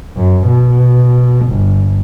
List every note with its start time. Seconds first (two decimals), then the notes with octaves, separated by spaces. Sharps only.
0.16 F#2
0.47 B2
1.46 G1